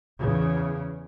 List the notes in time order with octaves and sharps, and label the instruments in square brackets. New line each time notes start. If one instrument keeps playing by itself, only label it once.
[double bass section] E2 C#3